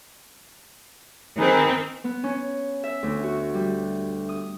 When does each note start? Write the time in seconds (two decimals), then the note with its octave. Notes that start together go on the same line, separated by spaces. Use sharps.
1.38 D#3 C4 G#4 A#4 B4
2.04 B3
2.24 C#4
2.84 E5
3.03 D2
3.24 F#4
3.54 G3
4.29 D#6